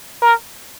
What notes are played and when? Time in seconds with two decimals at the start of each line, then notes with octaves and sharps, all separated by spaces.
0.22 A#4